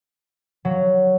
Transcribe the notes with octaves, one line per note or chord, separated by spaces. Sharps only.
F#3